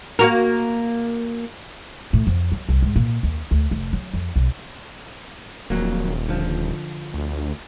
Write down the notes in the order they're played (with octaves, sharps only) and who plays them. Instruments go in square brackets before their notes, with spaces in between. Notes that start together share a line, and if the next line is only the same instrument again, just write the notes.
[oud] A#3 F#4 A#4
[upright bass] A2
F2
F#3
C2
G#2
A#2
D#2
D2
F1
F#3
F2
B1
[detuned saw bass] D#1 [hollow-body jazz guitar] F2 F#3 A#3
[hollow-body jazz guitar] D3 F3
[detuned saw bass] D2